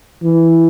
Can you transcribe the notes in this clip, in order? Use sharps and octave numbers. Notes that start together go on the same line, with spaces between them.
E3